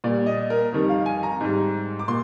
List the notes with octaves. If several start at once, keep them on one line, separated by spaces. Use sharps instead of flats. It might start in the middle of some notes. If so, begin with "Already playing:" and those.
A#2 G3 D5
D#5
A#4
F2 D#3 G3
F5
G#5
A#5
G#2 G3
D6
A#2 C6